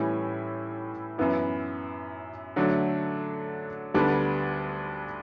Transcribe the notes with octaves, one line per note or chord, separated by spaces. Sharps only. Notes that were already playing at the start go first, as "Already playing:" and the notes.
Already playing: A2 E3 G3 C#4 E4
F#2 E3 B3 E4
D3 F#3 A3 D4
D2 D3 G3 B3 D4